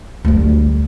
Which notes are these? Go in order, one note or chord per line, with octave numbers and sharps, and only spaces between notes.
D2 G3